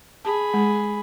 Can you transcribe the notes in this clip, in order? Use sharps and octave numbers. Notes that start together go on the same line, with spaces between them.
G#4 A5 B5
G#3